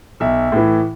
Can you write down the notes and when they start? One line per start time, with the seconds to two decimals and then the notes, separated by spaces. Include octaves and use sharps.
0.20 B1 E5
0.52 A2 E3